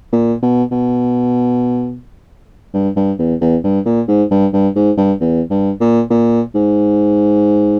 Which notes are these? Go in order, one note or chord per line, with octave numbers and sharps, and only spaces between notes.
A#2
B2
B2
G2
G2
E2
E2
G2
A#2
G#2
G2
G2
G#2
G2
E2
G2
A#2
A#2
G#2